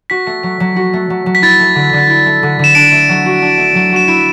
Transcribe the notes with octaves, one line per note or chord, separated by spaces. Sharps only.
F#4 B6
A3
F#3
F#3
F#4
A3
F#3
F#3
B6
E4 A6
A3
D3
D3
E4
A3
D3
D3 E7
D4 D7
A3
F#3
F#4
D4
A3
F#3
F#4 E7
E4 D7